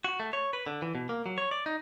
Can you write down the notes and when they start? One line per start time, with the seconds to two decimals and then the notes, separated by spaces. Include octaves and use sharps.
0.04 F#4
0.20 A3
0.33 C#5
0.53 B4
0.66 D3
0.82 E3
0.95 B2
1.09 A#3
1.26 F#3
1.38 C#5
1.51 D5
1.66 D#4